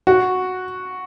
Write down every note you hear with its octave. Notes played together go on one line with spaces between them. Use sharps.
F#4